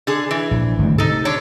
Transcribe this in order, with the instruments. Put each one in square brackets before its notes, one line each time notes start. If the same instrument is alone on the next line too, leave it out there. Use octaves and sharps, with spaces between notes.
[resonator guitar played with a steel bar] D3 G#4
E3
[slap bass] A#1
G#1 D2 G2
[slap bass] C3 [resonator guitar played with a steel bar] D#4 A4
[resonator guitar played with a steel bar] D3 D4 C#5